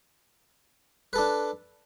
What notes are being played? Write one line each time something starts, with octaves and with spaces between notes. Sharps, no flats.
D4 A4 B4